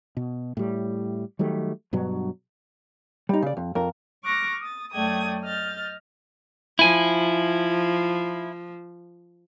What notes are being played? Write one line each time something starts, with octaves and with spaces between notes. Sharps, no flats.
B2
A2 G3
D#3 F#3 G3 A3
G2 B2 F#3
G3 D#4
C#3 D5
F2
F2 A#4
C#6 D6 F6 F#6 A#6
D#6 A6
F#2 A3 D5 G5 D#6 G#6
D#5 F6 G6 A6
F3 E4 G#5